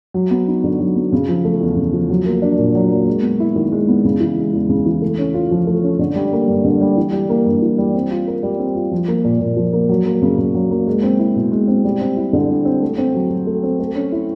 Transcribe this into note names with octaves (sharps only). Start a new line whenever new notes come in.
F#3
B3
D#4
D3
F#3
B3
C#3
F3
A3
E2
C#3
F3
F#3
A#3
D4
A#2
F#3
A#3
G#3
B3
E4
D#3
G#3
B3
C#3
E3
G#3
E2
C#3
E3
A3
C#4
F4
F3
A3
C#4
D3
G3
A#3
G2
D3
G3
E3
G3
A#3
G2
E3
G3
C4
F4
A#4
G3
C4
F4
F3
A#3
A#2
A#2
F3
A#3
F#3
A#3
C#3
C#3
F#3
A#3
G#3
C4
E4
B2
G#3
C4
G3
C4
E4
D3
G3
C4
A3
C4
F#3
F#3
A3
C4
A3
C#4
E4